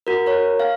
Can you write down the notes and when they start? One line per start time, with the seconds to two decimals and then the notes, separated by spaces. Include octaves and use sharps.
0.07 F#4 A#4
0.26 A#4 C#5
0.60 F5